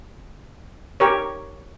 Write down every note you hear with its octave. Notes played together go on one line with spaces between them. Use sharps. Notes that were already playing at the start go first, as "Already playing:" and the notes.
G4 A#4 C#5